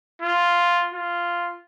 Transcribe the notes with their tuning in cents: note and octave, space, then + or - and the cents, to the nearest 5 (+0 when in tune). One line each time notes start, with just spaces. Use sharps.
F4 +0
F4 -5